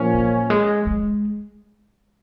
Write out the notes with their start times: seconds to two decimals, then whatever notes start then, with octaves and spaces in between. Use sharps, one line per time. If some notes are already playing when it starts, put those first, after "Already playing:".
Already playing: A#2 F3 A#3 C#4
0.14 F#3
0.50 G#3
0.87 G#3